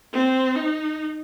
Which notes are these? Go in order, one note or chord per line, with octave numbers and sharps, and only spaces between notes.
C4
D#4